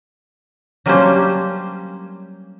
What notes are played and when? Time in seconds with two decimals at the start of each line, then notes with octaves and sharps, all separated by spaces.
0.86 F#3 G3 A#3 C#4 D4 C5